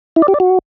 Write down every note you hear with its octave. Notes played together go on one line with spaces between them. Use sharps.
E4
D5
G4
D5
F#4